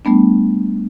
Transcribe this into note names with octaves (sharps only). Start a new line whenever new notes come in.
G3 A3 B3 D4